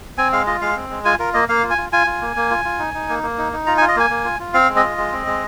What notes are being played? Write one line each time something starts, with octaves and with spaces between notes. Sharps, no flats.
C4 G#5
G#3 F5
F4 D#5
G#3 F5
C4
G#3
F4 G#5
F4 A#4
A#3 D#5
A#3 F5
F4
G#5
F4
F4 G#5
F4
A#3
A#3
F4
F4
D#4
D#4
A#3
A#3
D#4
D#4
F4 A#5
G#5
F4
D#5
A#3 G#5
A#3
F4
F4
C4 F5
G#3
D#5
F4
G#3
C4
G#3